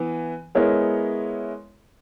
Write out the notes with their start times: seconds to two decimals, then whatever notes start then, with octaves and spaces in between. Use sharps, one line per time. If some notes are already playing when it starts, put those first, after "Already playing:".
Already playing: E3 B3
0.55 G#3 B3 E4 A#4 C#5